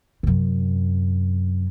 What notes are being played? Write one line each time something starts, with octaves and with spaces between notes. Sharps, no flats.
F#2 C3